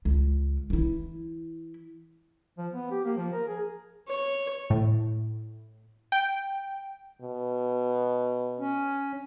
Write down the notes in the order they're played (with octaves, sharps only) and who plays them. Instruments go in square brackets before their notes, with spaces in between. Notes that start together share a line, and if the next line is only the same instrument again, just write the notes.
[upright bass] C#2
E3 E4
[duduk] F3
B3
G4
A#3
F3
A#4
G#4
[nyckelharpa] C#5
[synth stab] A2
G5
[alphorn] B2
[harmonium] C#4